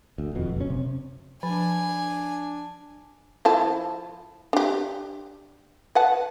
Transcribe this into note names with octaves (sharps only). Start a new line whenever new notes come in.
D2
D#1 F2 B2
F#1 C#4
C3
F3 D4 G#5
F3 E4 A5
D4 G4
B4 F#5 A5